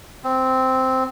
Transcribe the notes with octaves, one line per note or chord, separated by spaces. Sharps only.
C4